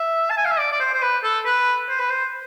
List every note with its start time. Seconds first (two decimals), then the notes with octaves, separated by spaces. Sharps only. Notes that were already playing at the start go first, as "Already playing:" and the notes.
Already playing: E5
0.30 A5
0.37 G#5
0.45 F5
0.51 E5
0.59 D5
0.72 D5
0.80 C5
0.94 C5
1.02 B4
1.24 A4
1.45 B4
1.89 C5
1.99 B4
2.10 C5